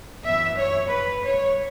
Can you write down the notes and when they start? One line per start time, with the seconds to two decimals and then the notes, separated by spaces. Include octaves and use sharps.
0.24 F#2 E3 B3 E5
0.58 C#5
0.90 B4
1.23 C#5